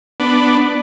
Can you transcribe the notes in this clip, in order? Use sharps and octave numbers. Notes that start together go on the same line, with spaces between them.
B3 D4